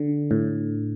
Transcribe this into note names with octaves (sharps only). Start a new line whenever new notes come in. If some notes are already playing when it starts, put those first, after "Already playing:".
Already playing: D3
A2